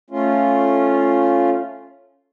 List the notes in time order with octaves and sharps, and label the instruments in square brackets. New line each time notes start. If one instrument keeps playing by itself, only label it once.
[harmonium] A3 C#4 F4